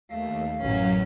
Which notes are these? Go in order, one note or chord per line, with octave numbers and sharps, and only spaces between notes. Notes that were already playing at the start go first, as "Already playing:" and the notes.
D#2 A3 F5
A1 F#2 F#3 C#4